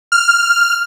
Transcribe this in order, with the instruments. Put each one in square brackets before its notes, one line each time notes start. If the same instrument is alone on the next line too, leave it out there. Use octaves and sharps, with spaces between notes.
[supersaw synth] F6